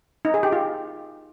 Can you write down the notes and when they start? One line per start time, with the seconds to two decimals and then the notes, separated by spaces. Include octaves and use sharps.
0.25 D#4
0.34 G#4
0.43 G4
0.52 F4